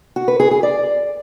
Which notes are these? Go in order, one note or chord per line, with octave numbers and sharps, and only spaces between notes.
F#4
B4
G#4
G#4
D5